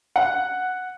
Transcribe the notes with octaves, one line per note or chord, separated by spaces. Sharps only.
F#5